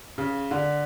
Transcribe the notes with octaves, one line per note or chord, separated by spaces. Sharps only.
C#3
D3